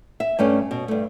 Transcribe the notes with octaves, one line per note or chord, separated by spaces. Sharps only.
E5
G2 A3 C#4 G#5
B2
G2 A3